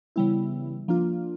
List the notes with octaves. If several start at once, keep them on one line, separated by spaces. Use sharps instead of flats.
C#3 E3 G3 B3 E4
F3 A#3 D4 F4